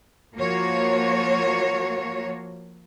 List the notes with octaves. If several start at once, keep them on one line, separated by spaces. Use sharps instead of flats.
F3 A#3 F#4 C#5